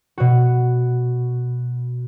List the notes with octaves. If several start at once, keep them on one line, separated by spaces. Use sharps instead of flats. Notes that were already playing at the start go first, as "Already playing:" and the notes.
B2 F#4